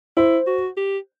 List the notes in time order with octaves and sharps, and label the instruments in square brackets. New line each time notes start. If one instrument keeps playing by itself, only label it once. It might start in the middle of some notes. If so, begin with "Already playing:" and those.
[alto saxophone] E4 [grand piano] C5
[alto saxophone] F#4
G4